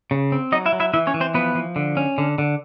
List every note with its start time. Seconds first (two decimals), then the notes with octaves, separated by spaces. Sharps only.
0.11 C#3
0.32 C4
0.52 F#3 D#4 D#5
0.66 E4 E5
0.72 F#3
0.80 E4 E5
0.94 E3 E4 E5
1.07 C#4 C#5
1.14 E3
1.20 C4 C5
1.34 F3 B3 B4
1.55 F3
1.76 D3
1.97 C#4
2.18 D3
2.38 D3